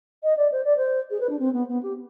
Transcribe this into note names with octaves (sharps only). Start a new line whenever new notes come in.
D#5
D5
C5
D5
C5
G#4
B4
D4
C4
B3
B3
G4